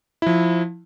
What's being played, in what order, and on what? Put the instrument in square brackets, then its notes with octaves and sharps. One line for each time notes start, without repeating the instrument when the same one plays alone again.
[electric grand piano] F3 E4